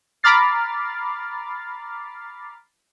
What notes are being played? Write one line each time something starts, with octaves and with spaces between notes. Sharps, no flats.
A#5 B5 D6 F6 A6 C7